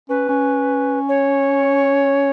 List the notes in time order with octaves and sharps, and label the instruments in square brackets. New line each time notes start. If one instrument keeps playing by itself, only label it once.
[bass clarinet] C#4 [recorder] B4
[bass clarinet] C#4
[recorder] C#5